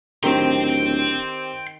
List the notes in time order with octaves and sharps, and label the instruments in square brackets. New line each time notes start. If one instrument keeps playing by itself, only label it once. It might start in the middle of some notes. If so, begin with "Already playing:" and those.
[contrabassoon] D1 [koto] D#3 [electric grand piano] C4 G4 [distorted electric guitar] G5 C6